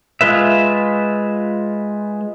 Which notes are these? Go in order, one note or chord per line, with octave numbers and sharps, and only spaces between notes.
G#3 F4 B4 E5